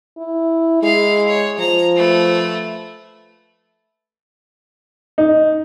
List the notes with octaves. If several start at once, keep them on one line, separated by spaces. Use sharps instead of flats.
E4
G#3 E4 F5
C#5
F3 A#5
A3 B4
D#4